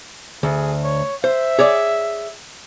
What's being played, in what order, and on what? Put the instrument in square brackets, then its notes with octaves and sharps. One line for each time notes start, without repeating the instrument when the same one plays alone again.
[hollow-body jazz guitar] D2 [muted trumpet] G#4
[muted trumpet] C#5
[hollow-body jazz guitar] C5 [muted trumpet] E5
[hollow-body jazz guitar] G#4 C#5 D5